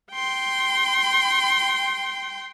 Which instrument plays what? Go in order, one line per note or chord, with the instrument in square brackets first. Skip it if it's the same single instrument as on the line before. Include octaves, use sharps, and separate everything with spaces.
[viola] G5 C6